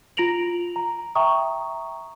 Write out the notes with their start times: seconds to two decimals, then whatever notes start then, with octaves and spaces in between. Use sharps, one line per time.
0.17 F4 A#5 A#6 D7 F7 F#7
0.76 A#5
1.15 E5 G5 A#5 C#6 D#6